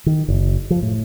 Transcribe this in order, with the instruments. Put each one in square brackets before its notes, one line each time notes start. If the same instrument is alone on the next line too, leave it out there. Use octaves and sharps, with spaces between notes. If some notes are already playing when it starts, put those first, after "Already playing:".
[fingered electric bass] D#3
F#1
F3
A2